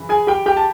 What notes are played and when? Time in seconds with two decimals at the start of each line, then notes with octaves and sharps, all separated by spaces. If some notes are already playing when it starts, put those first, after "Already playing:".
Already playing: F#2 C#3 E3
0.09 G#4 G#5
0.27 G4 G5
0.46 G4 G5
0.57 A5